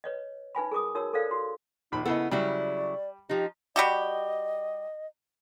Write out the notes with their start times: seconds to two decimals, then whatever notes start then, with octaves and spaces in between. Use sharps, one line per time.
0.04 B4 C#5 D#5
0.55 D#4 B4 G#5 B5
0.71 G#4 A#4 D6 D#6
0.95 D#4 F#4 A#4 C#5 E6
1.13 A4 A#4 C5 D5 F5
1.31 F#4 C6
1.92 A#1 D#2 D#4 B5
2.05 C#3 B3 E4 A4 D#5
2.31 C#3 F#3 G3 E4 D5
3.29 F3 D#4 G4
3.76 G3 F#4 G4 D#5